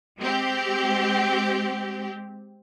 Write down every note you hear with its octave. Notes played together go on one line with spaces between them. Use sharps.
G#3 C4 G4